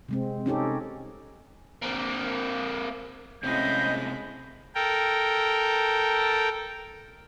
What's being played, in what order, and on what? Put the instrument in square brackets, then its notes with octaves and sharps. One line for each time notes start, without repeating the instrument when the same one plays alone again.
[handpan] C3 G#3 C4
C#4 D#4 G4 A4
[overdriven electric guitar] A#3 C4
[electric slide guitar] A2 C3 [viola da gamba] G#3 C#4 E4 [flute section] D#5 F5 [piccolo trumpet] G6
[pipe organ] A4 A#4 G5